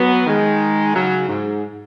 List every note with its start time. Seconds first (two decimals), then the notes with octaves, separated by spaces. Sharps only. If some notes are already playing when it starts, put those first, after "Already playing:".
Already playing: F#3 B3
0.26 D#3 G#3
0.94 C#3 F#3
1.28 G#2